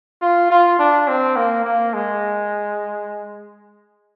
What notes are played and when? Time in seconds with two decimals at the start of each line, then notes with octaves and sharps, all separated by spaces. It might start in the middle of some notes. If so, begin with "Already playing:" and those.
0.21 F4
0.50 F4
0.79 D4
1.08 C4
1.36 A#3
1.64 A#3
1.93 G#3